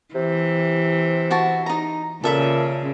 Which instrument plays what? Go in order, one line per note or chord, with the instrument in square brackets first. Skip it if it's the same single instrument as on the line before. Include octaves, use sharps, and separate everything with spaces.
[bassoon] C3 [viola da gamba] E3
[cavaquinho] E4 F#4 A5
D#4 A#5
[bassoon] A#2 [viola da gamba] C#3 [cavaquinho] A4 E5 B5